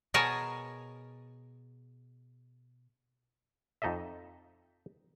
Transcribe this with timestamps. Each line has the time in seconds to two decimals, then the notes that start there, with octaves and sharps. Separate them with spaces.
0.14 B2 G#4 A#4 C#5 G#5 A5
3.82 F2 D#4 A4 D#5 E5